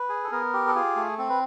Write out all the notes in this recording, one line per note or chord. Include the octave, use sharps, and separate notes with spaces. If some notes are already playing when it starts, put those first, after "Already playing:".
Already playing: B4
G#4
A4
B3 A#4
G4
A4
F4 G#4
A3
C4 A4
B4